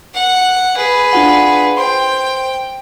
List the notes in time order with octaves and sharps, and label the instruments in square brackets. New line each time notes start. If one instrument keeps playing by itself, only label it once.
[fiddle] F#5
G#4 B4
[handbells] D4 F4 F#5
[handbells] C5 C6 [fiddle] G5